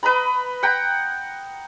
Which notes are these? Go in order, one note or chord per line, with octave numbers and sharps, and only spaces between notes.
B4 D#5 A#5 B5
F#5 G5 A#5